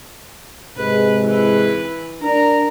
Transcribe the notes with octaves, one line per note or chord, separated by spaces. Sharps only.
G#2 C3 G#3 B4
E3 B4
D4 A#4 A#5